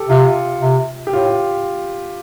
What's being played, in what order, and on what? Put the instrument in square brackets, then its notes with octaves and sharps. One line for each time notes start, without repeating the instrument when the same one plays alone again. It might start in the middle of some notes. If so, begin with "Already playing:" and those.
Already playing: [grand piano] G4 A4
[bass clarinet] C3 [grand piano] F4
[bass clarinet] C3
[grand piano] G4
[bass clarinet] A2 [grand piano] F4